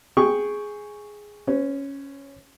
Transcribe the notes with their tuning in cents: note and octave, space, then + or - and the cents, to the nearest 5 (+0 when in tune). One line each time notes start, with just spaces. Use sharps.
G#4 +0 G5 +0 C#6 +0
C#4 +0 C5 -40